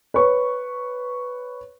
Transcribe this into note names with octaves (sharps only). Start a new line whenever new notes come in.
B4 C#5 C#6